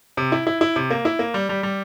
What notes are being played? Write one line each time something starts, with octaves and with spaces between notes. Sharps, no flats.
C3
E4
E4
E4
C3
A#3
E4
A#3
G3
G3
G3